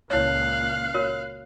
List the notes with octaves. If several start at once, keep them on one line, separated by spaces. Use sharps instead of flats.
C#2 A#2 E4 C#5 F5 F#6
F#4 A#4 C#5